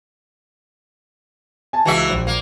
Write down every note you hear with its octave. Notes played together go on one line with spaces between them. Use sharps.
G#5 A5
C#2 E3 F#4 E5
A#1
A#3